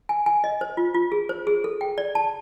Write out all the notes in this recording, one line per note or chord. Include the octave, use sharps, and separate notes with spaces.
G#5
G#5
D#5
C5
F4
F4
G#4
C5
G#4
A4
G5
D5
A5